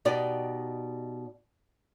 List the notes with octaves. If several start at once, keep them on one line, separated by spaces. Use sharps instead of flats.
B2 D#4 G4 D5